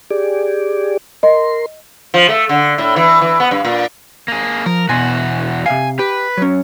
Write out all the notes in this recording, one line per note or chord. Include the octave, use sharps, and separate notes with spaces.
G4 G#4 D5
A#4 D#5 C6
F3
A3
D3
A2
E3
E3
B3
G2
A#2
A#3 G#4
F3 A#4
E2 B2 F#4 G#5 C6
C3 E5 F5 G#5
G4 B4
F#3 C#4